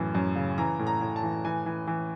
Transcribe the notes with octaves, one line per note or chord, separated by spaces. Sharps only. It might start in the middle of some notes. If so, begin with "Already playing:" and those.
Already playing: F#2 A2 E3
F#2
C#3
E3 A#5
A2
A#5
A2
A5
E3
E3 G#5
E3
E3